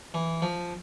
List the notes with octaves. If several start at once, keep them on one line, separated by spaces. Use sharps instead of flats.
E3
F3